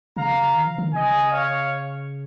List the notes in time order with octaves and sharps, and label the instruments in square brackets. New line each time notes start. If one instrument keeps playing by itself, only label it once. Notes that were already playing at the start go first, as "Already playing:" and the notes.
[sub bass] C#3 [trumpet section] F5 A#5
[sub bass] D#3
F3
D#3
[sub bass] C#3 [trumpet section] D#5 G#5
[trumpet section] C#5 F5